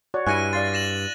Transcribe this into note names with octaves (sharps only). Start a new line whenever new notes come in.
F#4 C#5 D5
G2 E4 G#5 C#6 F#6 A#6 D#7
D5 F5 C6 A6
A#6 E7 F#7